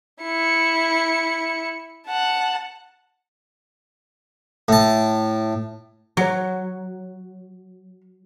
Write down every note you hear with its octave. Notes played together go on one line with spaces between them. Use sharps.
E4 C#7
F#5 A5
A2 A5
F#3 F#4 C#5